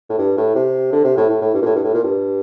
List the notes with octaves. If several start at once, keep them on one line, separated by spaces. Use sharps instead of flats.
A2
G2
A2
C3
D3
C3
A2
A2
A2
G2
A#2
A2
G2
A2
A#2
G2